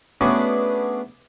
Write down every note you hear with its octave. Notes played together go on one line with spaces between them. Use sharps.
A3 B3 C#4 D4 F#4 G#4